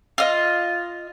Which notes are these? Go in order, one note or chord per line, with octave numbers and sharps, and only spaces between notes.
F4 D#5